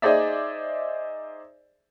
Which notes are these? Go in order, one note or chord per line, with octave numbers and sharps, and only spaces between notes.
D#4 G#4 C5 D5 E5